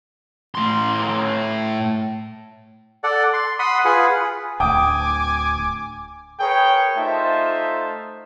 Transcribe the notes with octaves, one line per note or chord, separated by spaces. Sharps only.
A2 C6
A4 D5 F#5
C6
F#5 B5 C6 D#6
F4 G#4 B4 F#5
D1 D2 G5 G#5 D6 D#6
G#4 A#4 B4 C#5 G5
A3 D#4 F4 C5 E5 A5